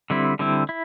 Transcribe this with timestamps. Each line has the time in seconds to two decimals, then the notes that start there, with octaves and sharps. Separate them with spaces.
0.10 D3 G3 C4 E4
0.39 D3 G3 C4 E4
0.69 E4